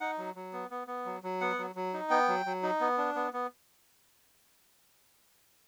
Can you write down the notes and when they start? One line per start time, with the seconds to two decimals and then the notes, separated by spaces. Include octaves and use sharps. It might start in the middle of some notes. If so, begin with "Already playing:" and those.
0.01 D#4 F#5
0.18 F#3
0.35 F#3
0.53 B3
0.71 B3
0.87 B3
1.05 F#3
1.23 F#3
1.41 B3 F#5
1.58 F#3
1.75 F#3
1.94 D#4
2.10 B3 G5
2.28 F#3
2.46 F#3
2.63 D#4
2.81 B3
2.98 D4
3.15 B3
3.33 B3